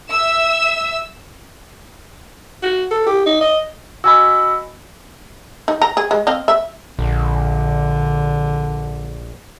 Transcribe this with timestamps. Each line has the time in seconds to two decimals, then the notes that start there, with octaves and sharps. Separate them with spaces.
0.10 E5 E6
2.63 F#4
2.91 A4
3.06 G4
3.26 D#4
3.41 D#5
4.04 F#4 D#5 G#5 B5 E6
5.68 D#4
5.82 A#5
5.97 G#4
6.11 G#3
6.27 C4 D#5 F5
6.48 E5
6.99 A#1 D3